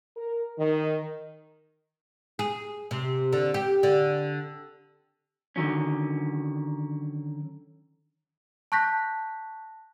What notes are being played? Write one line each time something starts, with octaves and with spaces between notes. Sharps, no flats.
A#4
D#3
G#4
C3
D3
G4
D3
D3 D#3 F#3 C#4
A5 C#6 F#6 G6 A#6 B6